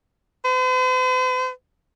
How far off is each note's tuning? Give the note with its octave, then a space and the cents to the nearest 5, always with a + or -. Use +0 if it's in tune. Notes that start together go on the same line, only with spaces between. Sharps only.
C5 -45